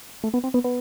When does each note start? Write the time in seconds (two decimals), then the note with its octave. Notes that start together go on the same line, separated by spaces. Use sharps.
0.24 A3
0.34 B3
0.44 C4
0.54 B3
0.64 B3